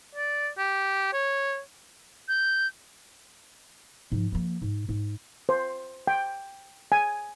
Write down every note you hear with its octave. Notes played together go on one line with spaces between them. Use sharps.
D5
G4
C#5
G6
G#2 F3
F3 A#3
G#2
G#2
C5
G5
G#5